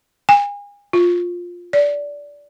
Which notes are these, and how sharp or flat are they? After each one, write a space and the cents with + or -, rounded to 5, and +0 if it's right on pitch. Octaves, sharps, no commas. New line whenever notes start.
G#5 -35
F4 +10
D5 -20